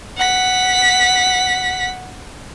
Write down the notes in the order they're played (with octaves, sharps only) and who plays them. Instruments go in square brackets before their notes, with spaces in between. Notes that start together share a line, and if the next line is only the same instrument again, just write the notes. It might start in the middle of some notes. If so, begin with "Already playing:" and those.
[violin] F#5 B6